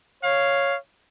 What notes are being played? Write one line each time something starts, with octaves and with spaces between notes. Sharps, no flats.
C#5 F5